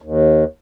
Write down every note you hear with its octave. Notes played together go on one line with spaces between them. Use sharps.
D#2